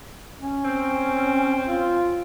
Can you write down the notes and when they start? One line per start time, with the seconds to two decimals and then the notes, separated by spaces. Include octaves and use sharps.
0.39 C#4
0.65 C4
1.65 F4